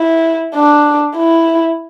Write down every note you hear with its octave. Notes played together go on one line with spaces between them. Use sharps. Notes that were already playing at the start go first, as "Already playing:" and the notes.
Already playing: E4
D4
E4